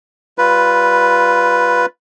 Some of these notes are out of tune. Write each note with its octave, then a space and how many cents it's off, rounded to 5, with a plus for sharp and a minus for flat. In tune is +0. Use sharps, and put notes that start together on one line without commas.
G3 -10 F4 +0 B4 +0